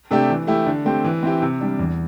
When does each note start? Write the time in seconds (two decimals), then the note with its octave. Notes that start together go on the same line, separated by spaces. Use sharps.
0.11 C3 A3 D4 G4
0.29 E3
0.47 A3 E4 G4
0.66 D3
0.85 A3 C4 G4
1.04 E3
1.23 C4 E4 G4
1.42 C3
1.61 G3 D4
1.79 E2